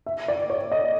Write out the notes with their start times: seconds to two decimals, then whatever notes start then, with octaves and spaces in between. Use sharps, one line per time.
0.06 E5
0.28 D5
0.50 C#5
0.72 D#5